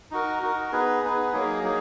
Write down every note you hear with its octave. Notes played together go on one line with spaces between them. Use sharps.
D#4 F#4 A#4
D#4 F#4 A#4
B3 D#4 G#4 B4
B3 D#4 G#4 B4
F#3 A#3 D#4 G#4
F#3 A#3 D#4 G#4